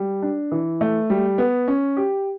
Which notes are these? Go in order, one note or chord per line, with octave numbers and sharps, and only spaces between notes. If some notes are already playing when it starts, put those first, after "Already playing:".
Already playing: G3
D4
E3
A3
G3
B3
C#4
G4